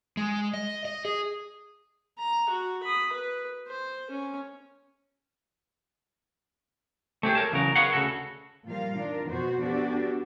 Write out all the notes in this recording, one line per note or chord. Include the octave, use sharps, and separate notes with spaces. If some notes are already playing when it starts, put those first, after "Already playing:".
G#3
D#5
D#5
G#4
A#5
F#4
B5 D#6
B4
C5
C#4
A3 C4 G4 G#4
A#4 C#5 A5
E2 C#3 F#3 A#4
G#4 A#4 B4 C#5 F5 F#5
D2 C#3 F#4 A4
A#2 F3 G3 F4 A#4 F5
D#3 D4 F4 A#4
F2 B2 B3 F#4 C5
B3 D4 F#4 G4 A4